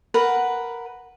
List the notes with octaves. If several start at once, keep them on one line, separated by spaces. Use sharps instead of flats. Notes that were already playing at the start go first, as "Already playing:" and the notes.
A#4 B4 F#5